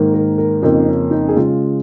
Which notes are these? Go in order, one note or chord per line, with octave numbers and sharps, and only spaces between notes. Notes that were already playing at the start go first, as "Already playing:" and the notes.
Already playing: G#2 D#3 A#3
A#4
A#4
F2 C#3 A#3 D#4
C#4
D#4
G#4
C#3 G#3 F4